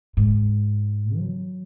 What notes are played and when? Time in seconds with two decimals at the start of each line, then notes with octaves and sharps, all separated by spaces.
0.17 G#2
1.17 F#3